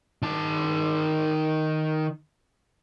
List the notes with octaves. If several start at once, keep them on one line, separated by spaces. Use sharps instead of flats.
D#3 A5